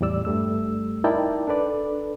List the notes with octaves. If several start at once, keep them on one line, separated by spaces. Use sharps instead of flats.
E2 A2 G3 D5 E6
G2 G3 A3 E6
D#4 E4 A#4 D5 G5 A5
D4 A4 B4 D5